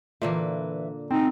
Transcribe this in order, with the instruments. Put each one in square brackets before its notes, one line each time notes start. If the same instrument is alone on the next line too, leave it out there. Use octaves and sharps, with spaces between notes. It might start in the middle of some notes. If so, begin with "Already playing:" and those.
[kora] A#2 D3 A#3 [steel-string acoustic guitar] E3 B4 E5
[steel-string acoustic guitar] B2 [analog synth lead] C4 [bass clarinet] D#4